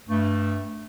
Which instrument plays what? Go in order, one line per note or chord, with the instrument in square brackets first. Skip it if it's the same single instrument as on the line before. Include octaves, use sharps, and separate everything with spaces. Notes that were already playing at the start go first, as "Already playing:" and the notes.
[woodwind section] G2 A3